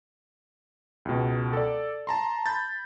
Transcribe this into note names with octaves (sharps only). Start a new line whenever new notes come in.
C#2 B2
A4 D5
A5 A#5 C6
B5 G6 A6